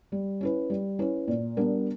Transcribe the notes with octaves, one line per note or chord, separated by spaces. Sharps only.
G3
C#4 E4 B4
G3
C#4 E4 B4
A#2
G3 B3 D4 A#4